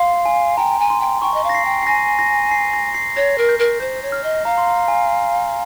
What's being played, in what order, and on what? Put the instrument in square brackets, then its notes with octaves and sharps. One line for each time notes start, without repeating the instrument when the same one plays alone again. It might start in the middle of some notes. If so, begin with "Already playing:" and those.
Already playing: [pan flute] F5 [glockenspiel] C6
[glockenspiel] G#5
[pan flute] G5 [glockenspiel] A#5
[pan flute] G#5
[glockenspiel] C6
[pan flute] G5
[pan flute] G5 [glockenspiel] C#6
[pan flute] D#5
F5
[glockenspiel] A#6
C7
[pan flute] G5
[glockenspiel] C7
[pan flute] G#5 [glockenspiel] A#6
[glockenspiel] A#6
C7
A#6
C7
[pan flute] C#5 [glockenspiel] A#6
[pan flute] A#4
[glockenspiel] G6
[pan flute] A#4
[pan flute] C5 [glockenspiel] G6
[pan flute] C#5
[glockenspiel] F6
[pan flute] D#5
[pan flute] F5 [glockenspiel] A#5
[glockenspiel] C6
A#5
G#5